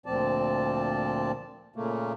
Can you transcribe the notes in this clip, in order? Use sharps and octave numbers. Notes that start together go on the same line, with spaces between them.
D2 A#2 F3 C4 D5 A5
A#2 C#3 A3 A#3